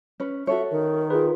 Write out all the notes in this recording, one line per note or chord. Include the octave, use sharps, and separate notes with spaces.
C#4 B4
F#4 A4 C#5 E5
D#3 A#4
F4 G#4 B4